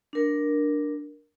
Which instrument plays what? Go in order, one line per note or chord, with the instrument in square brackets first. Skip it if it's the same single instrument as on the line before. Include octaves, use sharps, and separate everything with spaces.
[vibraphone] D4 A#4